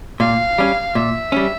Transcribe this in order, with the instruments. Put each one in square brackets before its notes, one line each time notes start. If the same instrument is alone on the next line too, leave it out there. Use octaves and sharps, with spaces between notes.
[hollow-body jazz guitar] A#2 [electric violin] F5
[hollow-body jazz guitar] G3 C#4
[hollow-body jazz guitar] A#2 [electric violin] E5
[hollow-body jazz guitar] G3 C#4